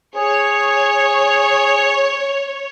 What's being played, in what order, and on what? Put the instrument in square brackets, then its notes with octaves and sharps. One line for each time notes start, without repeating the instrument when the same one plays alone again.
[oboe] G#4 [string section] C#5